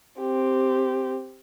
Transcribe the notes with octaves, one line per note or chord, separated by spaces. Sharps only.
C4 G4